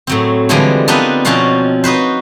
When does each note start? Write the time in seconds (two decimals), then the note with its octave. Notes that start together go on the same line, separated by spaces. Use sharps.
0.07 A2 F#3 C4
0.49 D3 E3 F3 G3 G#3 D4
0.88 B3 C4 D4 D#4 F4 B4
1.25 B2 F3 C4 C#4 F5 F#5
1.84 D#4 F#4 B4 C5